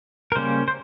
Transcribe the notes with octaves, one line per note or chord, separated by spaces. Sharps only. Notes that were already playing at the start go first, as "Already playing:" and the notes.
A#4
C#3 G3 A#3 C#4 C5
C5